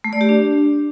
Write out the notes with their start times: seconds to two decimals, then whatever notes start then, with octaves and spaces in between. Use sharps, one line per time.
0.04 A3
0.13 D5
0.21 G4
0.29 D4